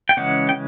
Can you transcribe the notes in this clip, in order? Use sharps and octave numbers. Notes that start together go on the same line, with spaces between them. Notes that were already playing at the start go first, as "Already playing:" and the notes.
G5
C#3 E3 G#3 C#4 F#5
G5